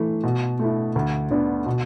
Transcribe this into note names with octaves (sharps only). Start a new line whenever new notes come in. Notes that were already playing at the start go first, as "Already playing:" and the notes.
Already playing: E3 A3
B2
A3 E4
D2
D3 B3 D4
B2